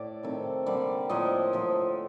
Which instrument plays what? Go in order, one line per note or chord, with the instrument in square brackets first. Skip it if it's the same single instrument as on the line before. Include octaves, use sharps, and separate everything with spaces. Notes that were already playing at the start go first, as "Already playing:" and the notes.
Already playing: [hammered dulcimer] A2 D5
C3 D#3 A3
D3 G3 A#3 D5
A2 F3 A#3 D#5
D3 F3 A3